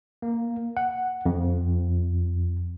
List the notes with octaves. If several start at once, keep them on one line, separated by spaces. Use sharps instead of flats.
A#3
F#5
F2